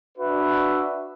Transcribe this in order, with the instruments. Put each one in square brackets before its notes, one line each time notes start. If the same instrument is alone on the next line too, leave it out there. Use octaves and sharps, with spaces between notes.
[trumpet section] D4 F#4 B4 E5